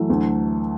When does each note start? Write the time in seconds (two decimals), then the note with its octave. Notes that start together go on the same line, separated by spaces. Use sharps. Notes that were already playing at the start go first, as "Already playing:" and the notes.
Already playing: E3 F#3 A3
0.10 D2